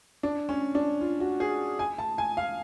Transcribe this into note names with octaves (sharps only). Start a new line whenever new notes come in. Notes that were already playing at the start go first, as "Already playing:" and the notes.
D4
C#4
D4
F4
F#4
G#4
G#5
A5
G#5
F5